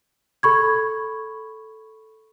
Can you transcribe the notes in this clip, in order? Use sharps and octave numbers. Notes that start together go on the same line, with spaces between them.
A4 B5 C#6 G#6